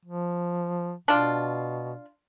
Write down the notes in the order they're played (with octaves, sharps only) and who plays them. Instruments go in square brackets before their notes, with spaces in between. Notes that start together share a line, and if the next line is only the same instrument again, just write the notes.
[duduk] F3
[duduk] B2 [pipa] D4 F4